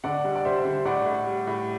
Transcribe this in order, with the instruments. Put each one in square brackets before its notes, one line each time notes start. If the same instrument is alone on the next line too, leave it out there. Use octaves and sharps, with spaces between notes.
[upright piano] D3 [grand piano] D5 F#5
[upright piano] G3
[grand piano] D5
[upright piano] G3 [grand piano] C5 E5
[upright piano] D3
[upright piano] A2 [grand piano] D5 F#5
[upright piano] A2
G3
A2